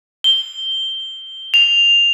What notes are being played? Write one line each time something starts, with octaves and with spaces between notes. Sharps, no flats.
G7
F7